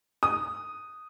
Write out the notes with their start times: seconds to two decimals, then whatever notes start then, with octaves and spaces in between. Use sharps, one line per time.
0.23 D#6